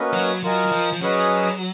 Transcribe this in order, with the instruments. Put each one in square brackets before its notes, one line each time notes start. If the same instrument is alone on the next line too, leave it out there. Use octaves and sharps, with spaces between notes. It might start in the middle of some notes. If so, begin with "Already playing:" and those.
Already playing: [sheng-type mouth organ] A#3 C#4 F#4 B4 D#5
[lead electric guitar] F#3
[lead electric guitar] F#3 [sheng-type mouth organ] F4 A#4 D#5 G#5
[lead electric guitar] F#3
F3
F3
[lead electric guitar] F#3 [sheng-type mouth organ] C#4 G#4 B4 D#5